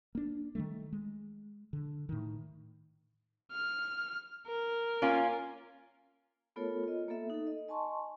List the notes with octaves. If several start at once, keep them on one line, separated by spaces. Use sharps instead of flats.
A#3 D4
D#3 F3 G3 A3
G#3
D3
A2 D#3
F6
A#4
A#3 C#4 F4
A3 B3 F4 A4 A#4 C#5
F4 D#5
A#3 B3 A4 E5
D#4 A4
D#5
D#5 G#5 A5 C6 C#6